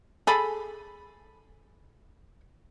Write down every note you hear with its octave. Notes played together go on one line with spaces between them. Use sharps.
G#4 A4 B5